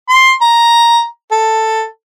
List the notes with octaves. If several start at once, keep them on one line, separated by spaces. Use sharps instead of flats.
C6
A#5
A4